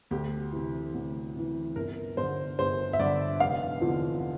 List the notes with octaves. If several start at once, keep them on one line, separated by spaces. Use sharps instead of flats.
D2 G4
C3 E3
D2
C3 E3
G1 A#4
G2 D3 C5
G1 C5
E5
G2 D3 D5
F1 F5
E2 D3 F3